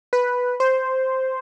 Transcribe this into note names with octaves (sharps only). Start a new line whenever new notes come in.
B4
C5